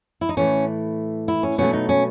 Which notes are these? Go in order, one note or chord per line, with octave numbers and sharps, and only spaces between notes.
E4
D#4
A2 E3 A3 C#4
E4
C#4
B2 F#3 A3 C#4
D#4
C#4